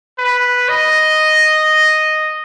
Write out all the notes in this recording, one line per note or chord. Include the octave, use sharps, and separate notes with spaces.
B4
D#5